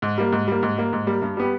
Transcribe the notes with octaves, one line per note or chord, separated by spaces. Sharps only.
G#2
G3 A#3
G#2
G3 A#3
G#2
G3 A#3
G#2
G3 A#3
G2
G3 B3 G4